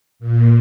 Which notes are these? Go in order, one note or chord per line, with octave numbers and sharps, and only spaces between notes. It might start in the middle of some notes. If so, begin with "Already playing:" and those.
A#2